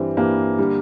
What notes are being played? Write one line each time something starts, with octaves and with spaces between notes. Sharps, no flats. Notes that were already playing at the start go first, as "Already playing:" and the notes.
Already playing: G2 E3 G3 C4
G2 E3 G3 A#3
D3 G3